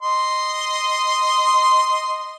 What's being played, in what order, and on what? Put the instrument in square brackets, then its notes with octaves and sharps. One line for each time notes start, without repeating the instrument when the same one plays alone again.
[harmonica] D#5 C6